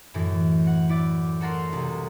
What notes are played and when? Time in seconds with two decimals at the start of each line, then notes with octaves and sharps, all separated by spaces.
0.14 F#2 A2 E3
0.67 F#5
0.89 E4 D5
1.41 F#4 A4 A#4 F#5 C6
1.73 C2